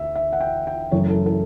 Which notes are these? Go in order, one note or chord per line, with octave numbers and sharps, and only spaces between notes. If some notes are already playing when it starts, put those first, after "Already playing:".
Already playing: D2 E5
E5
F#5
G5
G5
F#1 F#2 E3 A3 C#5
A4
A4